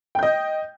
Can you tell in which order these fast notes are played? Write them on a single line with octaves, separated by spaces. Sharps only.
G5 G6 D#5